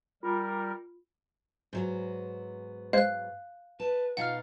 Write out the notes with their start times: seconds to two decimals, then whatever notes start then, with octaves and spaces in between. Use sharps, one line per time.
0.23 G3 F4 A#4
1.73 G#2 F#3 B3
2.93 G#3 C5 F5 F#6 G#6
3.80 B4 A5
4.17 B2 D#4 F4 F5 F#5 F6